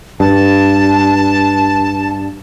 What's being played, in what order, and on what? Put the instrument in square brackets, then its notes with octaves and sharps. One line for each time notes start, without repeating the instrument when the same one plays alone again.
[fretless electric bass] G2 [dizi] A5